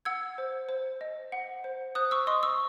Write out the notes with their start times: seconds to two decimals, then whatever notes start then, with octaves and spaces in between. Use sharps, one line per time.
0.05 F#5 E6 G#6
0.38 C5
0.69 C5
1.01 D#5
1.32 F#5
1.64 C5
1.95 C5 D#6 F#6
2.11 C#6 E6
2.27 D#5 C6 D#6
2.43 C#6 E6